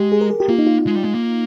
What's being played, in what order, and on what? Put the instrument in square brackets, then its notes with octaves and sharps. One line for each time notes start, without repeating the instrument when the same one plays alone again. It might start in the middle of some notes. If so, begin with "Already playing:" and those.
Already playing: [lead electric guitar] G#3 [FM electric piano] G4
[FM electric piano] G#4
A#4
G#4
G4
[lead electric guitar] A#3 [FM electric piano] F4
[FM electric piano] D#4
F4
[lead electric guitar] G#3
G3
G#3
A#3